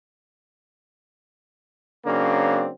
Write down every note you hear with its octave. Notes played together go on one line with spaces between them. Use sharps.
C#3 F#3 A#3 C4 D4